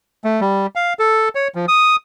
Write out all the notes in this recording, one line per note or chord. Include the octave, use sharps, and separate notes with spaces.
A3
G3
F5
A4
C#5
F3
D#6